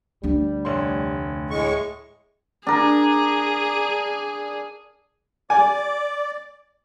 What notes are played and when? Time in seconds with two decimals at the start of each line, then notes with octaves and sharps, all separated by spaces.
0.23 D2 G3 D4
0.65 F1 C#5 C6
1.50 A2 G#3 G#4 C#6
2.67 D4 G#4 A#4
5.50 D5 G#5 D6